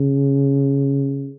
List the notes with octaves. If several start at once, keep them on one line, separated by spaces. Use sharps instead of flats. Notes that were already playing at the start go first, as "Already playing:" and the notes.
Already playing: C#3